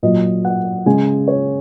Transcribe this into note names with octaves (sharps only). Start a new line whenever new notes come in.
A#2 F#3 D#5
F#5
C#3 G#3 G#5
C#5